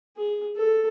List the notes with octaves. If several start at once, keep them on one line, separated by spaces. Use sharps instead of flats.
G#4
A4